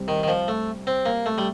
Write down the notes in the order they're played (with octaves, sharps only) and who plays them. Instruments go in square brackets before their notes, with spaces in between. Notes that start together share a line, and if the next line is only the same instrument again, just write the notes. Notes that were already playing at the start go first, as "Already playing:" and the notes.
Already playing: [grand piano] C2 C3 G3 C4
[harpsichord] D#3
D#3
F3
A3
C4
A#3
A3
G3